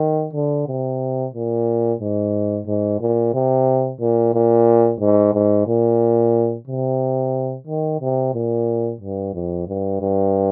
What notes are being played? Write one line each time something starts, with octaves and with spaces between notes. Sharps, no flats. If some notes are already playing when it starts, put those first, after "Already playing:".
Already playing: D#3
D3
C3
A#2
G#2
G#2
A#2
C3
A#2
A#2
G#2
G#2
A#2
C3
D#3
C3
A#2
G2
F2
G2
G2